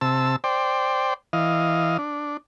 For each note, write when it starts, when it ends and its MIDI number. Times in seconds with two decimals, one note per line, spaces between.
0.01 0.36 48
0.01 0.36 81
0.01 0.36 88
0.44 1.14 72
0.44 1.14 74
0.44 1.14 79
1.33 1.97 52
1.33 1.97 75
1.33 1.97 77
1.99 2.37 62